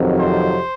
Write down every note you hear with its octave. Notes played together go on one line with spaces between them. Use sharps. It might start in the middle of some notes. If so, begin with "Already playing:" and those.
Already playing: F2 C3 D#3 F#3
C5